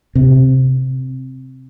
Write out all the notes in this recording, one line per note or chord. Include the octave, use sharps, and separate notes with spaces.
C3